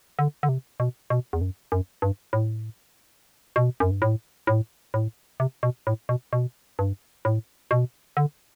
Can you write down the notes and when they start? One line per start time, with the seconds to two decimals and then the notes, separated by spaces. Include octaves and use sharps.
0.19 D3
0.43 D3
0.49 C3
0.80 B2
1.10 B2
1.33 E2
1.41 F#2
1.72 F#2
2.02 G2
2.33 A2
3.56 B2
3.80 F#2
3.91 G2
4.02 A2
4.47 A2
4.94 A2
5.40 C3
5.63 B2
5.87 A2
6.09 B2
6.33 B2
6.79 G2
7.25 A2
7.71 B2
8.17 D3